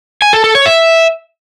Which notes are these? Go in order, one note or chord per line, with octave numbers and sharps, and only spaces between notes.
G#5
A4
A4
C#5
E5